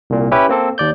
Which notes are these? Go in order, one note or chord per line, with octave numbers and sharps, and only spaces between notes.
C2 A#2
C#4 E4 G4 B4
A#3 C4 A4
D#2 D5 G6